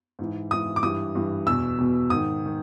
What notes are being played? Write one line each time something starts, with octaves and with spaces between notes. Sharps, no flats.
G#2 E3
G#2 E3 D#6
D6
G2 E3 D#6
G2 E3
E2 B2 E6
E2 B2
G#2 D#3 D#6
D#3